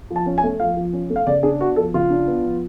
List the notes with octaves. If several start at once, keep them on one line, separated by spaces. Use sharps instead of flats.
F3
A5
C#4
G#5
A3
F3 F5
F3
C#4
A3
F5
C#3 D5
D4 G#4
B3 F#4
F3 A4
C#3 F4
D4
B3
F3